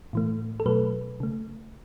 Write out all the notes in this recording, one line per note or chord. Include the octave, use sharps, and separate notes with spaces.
A2 E3 A3
A4
B2 F#3 A3 B4
C#3 A3